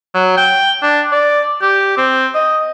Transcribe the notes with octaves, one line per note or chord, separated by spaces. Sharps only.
F#3
G5
D4
D5
G4
C4
D#5